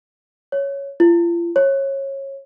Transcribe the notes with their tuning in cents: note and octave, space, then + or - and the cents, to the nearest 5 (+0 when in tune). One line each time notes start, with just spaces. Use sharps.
C#5 +5
F4 -40
C#5 -20